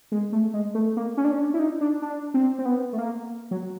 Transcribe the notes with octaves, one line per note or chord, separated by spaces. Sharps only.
G#3
A3
G#3
A3
A#3
C#4
D4
C#4
D4
E4
D#4
D4
D4
C4
C4
B3
A3
A#3
F#3